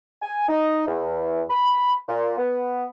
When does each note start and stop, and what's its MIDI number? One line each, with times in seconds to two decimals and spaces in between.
0.22 0.46 80
0.48 0.84 63
0.87 1.41 40
1.50 1.93 83
2.08 2.34 46
2.37 2.85 59